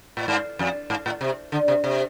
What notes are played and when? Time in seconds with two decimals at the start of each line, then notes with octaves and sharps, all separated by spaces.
0.17 A2
0.28 G#2
0.59 F2
0.90 G#2
1.06 A2
1.21 C3
1.52 D3
1.68 C3
1.84 C3